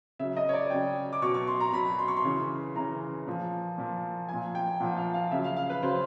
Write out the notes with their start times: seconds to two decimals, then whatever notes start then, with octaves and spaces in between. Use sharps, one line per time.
0.19 C#3 F#3 E5
0.37 D#5
0.49 C#5
0.54 D5
0.70 C#3 F#3 G5
1.13 D6
1.22 B2 C#6
1.26 F#3
1.34 C#6
1.47 C6
1.60 A#5
1.73 B2 F#3 B5
1.99 C6
2.08 C#6
2.17 C6
2.24 C#3 E3
2.76 C#3 E3 A#5
3.27 A#2 F3
3.78 A#2 F3
4.28 F3 G#5
4.34 A#2
4.55 G5
4.80 A#2 F3 F#5
4.97 F5
5.14 F5
5.31 C#3 F#3 E5
5.44 F5
5.57 F5
5.70 B4
5.83 C#3 F#3 C5